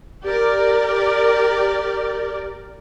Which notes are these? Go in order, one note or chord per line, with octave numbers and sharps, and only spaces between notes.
G4 A#4 D5